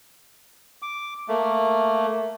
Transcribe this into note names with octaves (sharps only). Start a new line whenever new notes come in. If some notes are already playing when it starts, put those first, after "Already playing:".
D6
A3 A#3